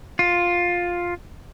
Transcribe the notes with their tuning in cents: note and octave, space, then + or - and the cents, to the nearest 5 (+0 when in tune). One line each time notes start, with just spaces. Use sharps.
F4 +10